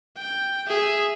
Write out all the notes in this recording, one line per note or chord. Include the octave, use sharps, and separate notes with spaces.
G5
G#4 E5